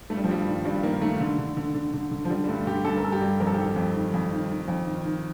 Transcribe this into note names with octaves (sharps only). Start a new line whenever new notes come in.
G2 A3
G3
F3
G2 G3
D#3
G2 G3
D#3 A#3
D#3 A3
D3
D3
D3
D3
D3
D3
F3
D3 G3
G3
G2 A3
D3 G4
G2 A4
A#4
G2 A4
G4
G2
F2 A#4
A4
G4
D#3 A4
F2
D#3
F2
D#3
D#3
F2
D#3
D#3